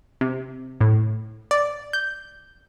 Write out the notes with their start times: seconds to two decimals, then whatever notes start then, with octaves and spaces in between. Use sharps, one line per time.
0.21 C3
0.81 A2
1.51 D5
1.93 G6